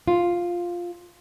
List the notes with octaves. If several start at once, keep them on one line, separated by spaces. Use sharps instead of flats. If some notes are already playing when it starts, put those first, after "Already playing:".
F4